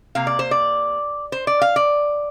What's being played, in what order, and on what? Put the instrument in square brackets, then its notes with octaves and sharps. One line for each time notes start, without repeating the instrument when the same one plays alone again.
[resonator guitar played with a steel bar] C3 A#3 F5
D5
C5
D5
C5
D5
F5
D5